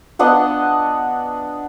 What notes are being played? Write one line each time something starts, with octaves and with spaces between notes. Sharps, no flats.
B3 D4 D#5 F#5